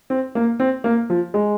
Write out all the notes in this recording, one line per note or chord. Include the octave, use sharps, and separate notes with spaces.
C4
A#3
C4
A#3
F3
G#3